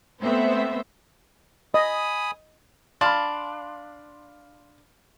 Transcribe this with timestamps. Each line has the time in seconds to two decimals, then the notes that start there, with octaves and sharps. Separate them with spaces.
0.22 A3 B3 C4 C5 E5
1.74 D#5 G#5 B5 D#6
3.01 D4 F5 B5 C6 F6 A6